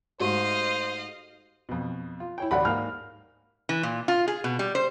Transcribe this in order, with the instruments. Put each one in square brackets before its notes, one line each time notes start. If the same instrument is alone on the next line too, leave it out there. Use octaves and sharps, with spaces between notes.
[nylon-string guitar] G#2 A3 [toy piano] F#4 G4 [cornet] C5 [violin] D#5 F5
[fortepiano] F2 B2
F4
E4 C#5 G5
[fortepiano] A1 D2 [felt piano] D5 F#5 B5
[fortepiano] G#2 A#3 F5 [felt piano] F6
[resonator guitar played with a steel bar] E3
A#2
F4
G#4
B2
G3
C5